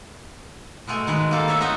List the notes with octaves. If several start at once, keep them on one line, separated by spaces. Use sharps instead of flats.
B2 G#3 A3 G#5
D#3 G#3 B4
A#3 A4 F5
A4 C#5 E5
C4 D#4 F#4 D#5 E5